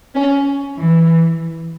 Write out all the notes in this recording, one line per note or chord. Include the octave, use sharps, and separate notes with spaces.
C#4
E3